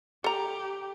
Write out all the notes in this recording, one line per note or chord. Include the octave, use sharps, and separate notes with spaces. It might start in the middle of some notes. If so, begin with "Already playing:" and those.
G4 A4 A#5